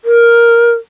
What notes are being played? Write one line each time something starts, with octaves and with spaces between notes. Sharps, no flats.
A#4